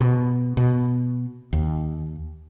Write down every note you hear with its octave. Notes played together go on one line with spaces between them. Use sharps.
B2
B2
D#2